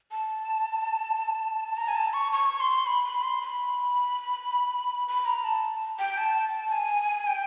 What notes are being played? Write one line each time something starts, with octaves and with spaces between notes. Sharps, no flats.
A5
A#5
G#5
A5
C#6
C#6
C6
B5
B5
C6
B5
B5
A#5
A5
G5
A5
G#5
G5